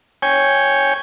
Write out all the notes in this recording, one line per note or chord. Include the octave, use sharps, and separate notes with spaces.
C#5 G5 G#5